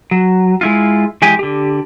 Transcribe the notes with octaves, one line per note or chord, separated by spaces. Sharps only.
F#3
G#3 E4 F4
E3 G#3 G4 G#5
D3 G4